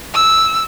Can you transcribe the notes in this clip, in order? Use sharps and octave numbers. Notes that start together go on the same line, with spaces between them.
E6